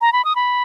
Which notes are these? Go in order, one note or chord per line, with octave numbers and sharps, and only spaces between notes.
A#5
B5
D#6
B5